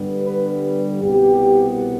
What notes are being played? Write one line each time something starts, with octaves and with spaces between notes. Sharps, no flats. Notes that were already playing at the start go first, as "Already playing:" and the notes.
Already playing: G2 D3 G3 B3
B4
C2 B2 B3 G4